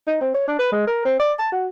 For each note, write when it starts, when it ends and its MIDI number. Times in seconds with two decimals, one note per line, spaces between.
0.07 0.19 63
0.21 0.34 60
0.34 0.45 73
0.48 0.55 62
0.59 0.69 71
0.72 0.86 56
0.87 1.01 70
1.05 1.16 60
1.19 1.34 74
1.39 1.48 81
1.52 1.68 66